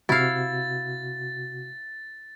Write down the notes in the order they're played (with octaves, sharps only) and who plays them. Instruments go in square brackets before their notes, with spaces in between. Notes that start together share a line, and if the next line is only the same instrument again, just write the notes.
[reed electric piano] C3 F#4 [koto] E4 F5 [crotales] A6